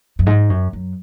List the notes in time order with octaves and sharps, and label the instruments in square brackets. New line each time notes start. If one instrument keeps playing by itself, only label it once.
[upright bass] F#2
G#2
F#2
F#2